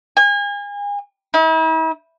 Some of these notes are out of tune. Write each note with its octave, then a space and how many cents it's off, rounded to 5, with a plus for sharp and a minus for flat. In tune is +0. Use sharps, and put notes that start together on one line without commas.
G#5 -35
E4 -45